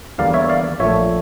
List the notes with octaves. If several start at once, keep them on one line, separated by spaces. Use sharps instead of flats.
E2 D3 G3 A#3 D5 F5
C#5 E5
D5 F5
A#1 A#2 A3 C#5 E5